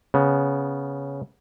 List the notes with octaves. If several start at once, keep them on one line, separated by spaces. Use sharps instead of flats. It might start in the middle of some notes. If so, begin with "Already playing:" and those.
C#3 B3